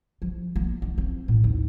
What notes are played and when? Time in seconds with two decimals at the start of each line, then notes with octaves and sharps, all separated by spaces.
0.22 F3
0.56 A#3
0.82 C#4
0.98 C4
1.28 A2
1.44 D#2